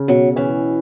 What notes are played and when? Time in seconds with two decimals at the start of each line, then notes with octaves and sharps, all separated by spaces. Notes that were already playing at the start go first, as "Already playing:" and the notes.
Already playing: C#3
0.08 B2 F#3
0.36 E3 C#4